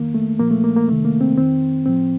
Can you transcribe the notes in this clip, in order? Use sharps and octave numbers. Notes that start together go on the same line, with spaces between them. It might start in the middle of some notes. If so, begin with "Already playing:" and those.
Already playing: F2 D#3 A#3
A3
A#2 F3 A#3
A3
A#3
A#3
F2 C3 D#3 A3
A#3
C4
F2 D#3 C4
A2 F3 C4